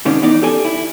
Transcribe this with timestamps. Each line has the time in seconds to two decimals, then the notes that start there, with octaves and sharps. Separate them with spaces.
0.05 G#2 C3 D#3 C#4 D4
0.22 E3 B3 D#4 D5
0.42 G4 A4 D5 G#5
0.65 E4